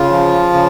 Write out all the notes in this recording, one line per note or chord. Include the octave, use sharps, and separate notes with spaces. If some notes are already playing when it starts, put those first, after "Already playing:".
Already playing: C#3 F4
F3
C#3